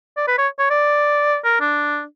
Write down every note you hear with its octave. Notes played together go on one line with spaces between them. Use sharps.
D5
B4
C#5
C#5
D5
A#4
D4